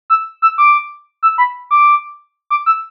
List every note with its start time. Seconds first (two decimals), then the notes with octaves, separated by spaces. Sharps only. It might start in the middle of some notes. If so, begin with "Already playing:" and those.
0.10 E6
0.42 E6
0.58 D6
1.23 E6
1.38 B5
1.71 D6
2.50 D6
2.66 E6